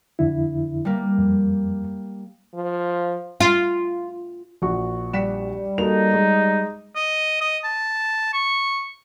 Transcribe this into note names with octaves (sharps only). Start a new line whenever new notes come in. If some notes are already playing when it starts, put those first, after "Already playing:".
F2 D3 E4
G3 A#3
F2
F3
F4
A#1 F#4 C#6
G3 B6 C#7 E7
A#3 D#4 F#4 A4 F7
G#3
D#5
D#5
A5
C#6